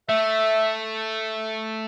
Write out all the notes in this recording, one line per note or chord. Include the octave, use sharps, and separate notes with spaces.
A3 E5